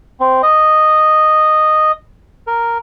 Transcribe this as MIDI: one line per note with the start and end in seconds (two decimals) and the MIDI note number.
0.20 0.42 60
0.43 1.92 75
2.47 2.78 70